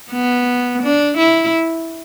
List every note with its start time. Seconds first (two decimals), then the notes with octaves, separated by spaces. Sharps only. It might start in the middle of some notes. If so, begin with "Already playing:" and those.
0.12 B3
0.83 D4
1.18 E4